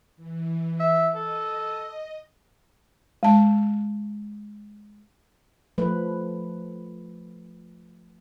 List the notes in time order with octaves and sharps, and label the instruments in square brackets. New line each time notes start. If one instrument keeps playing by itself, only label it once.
[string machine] E3
[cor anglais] E5
[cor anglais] A4 [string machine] D#5
[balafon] G#3 A5
[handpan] F3 A3 B4